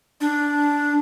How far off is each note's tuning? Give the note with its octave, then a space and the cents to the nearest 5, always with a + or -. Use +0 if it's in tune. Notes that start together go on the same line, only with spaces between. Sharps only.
D4 -5